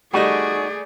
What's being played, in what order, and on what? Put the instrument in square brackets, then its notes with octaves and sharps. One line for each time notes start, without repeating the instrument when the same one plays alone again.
[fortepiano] G3 A3 D#5 [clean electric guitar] D#4 F#4 [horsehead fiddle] G#4 D5